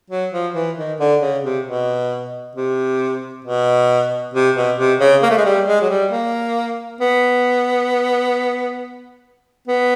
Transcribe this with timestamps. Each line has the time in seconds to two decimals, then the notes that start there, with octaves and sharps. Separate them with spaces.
0.10 F#3
0.32 F3
0.55 E3
0.77 D#3
1.00 D3
1.22 C#3
1.44 C3
1.66 B2
2.55 C3
3.45 B2
4.34 C3
4.56 B2
4.78 C3
5.00 C#3
5.23 A#3
5.30 A3
5.38 G#3
5.45 G3
5.67 G#3
5.81 F#3
5.90 G3
6.12 A#3
7.01 B3
9.68 B3